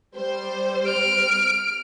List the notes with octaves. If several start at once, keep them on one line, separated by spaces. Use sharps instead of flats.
G3 C5
F6 D7